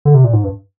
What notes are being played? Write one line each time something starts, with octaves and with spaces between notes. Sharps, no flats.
D3
C3
A#2
G#2
G2